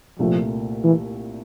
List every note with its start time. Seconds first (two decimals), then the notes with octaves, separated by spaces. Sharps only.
0.19 C2 A#2 F3 A3
0.84 E3